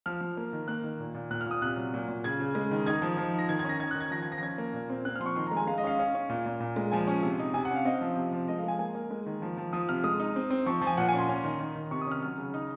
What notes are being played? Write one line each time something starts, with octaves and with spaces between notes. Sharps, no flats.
F3 F6
F3
A#3
D#3
A#3 F#6
D#3
A#2
A#2
A#2 F#6
F6
A#2 D#6
C3 F#6
F#3
A#2
A#2
C#3 G#6
C#3
G#3
D#3
D#4 G#6
F3
F3
D#4 A#6
D#3 G#6
G#6
C#4 A#6
D#4 G#6
F#6
D#3
G#6
F3 A#6
G#6
F3 A#6
A#6
C#4 G#6
A#3
A#2
C4
C4 F#6
F6
F3 C6
C#6
D#3 C6
A#5
G#3
G#5
G#3 F5
D#5
C#4 F5
C#4
C#4
A#2
A#2
A#2
G#3
F3 G#5
C#4
C3
D#4
C3 G#5
F#5
C#4 F5
C4 D#5
F5
F3
C3
F3
G#3 D#5
F5
G#3 G#5
A#3 G#5
A#3
G#3
D#3
F3
F3
F3 D#6
C3 F6
G#3 D#6
D#4
C4
C4
F3 C#6
F3
G#5
A#2 F#5
G#5
C#4
C6
C#4
D#3
D#3
D#3
C3 C#6
D#6
C#4 F6
F#3 F6
C#3
D#4